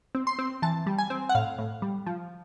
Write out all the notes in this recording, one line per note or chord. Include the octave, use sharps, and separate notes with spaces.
C4
C6
C4
E3 A5
G3
G#5
C4
F#5
A2 F5
A2
G3
F3